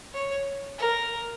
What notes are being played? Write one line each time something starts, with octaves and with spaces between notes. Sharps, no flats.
C#5
A#4